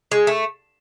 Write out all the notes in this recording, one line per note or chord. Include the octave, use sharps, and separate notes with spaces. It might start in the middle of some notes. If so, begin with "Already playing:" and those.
G#3
A3